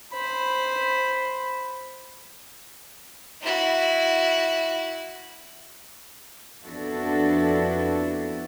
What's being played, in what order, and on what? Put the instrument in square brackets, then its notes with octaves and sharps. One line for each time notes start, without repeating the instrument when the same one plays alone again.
[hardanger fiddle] C5 B5
[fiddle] E4 F#4
[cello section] F2 B3 D4 E4 F#4 A4